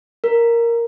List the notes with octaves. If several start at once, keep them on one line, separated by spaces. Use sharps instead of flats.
A#4